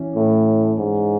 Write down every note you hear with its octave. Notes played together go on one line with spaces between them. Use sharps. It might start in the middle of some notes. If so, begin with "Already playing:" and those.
Already playing: E3 C#4
A2
G#2